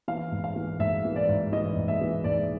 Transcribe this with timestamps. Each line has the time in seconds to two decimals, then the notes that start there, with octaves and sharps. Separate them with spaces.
0.08 E3 F5
0.32 G#2
0.44 F5
0.56 E3
0.80 G#2 E5
1.05 E3
1.16 D5
1.29 G#2
1.53 E3 D#5
1.77 G#2
1.88 E5
2.01 E3
2.24 G#2 D5